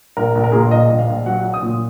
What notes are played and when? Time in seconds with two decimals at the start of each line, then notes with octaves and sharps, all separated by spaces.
0.17 A#1 A#4
0.35 A#1
0.44 A#4
0.52 A#2 G#4
0.60 A#4
0.71 A#1 D#5
0.90 A#1
0.99 F5
1.08 A#1
1.26 F#3 F#5
1.44 F#3
1.54 D#6
1.63 A#2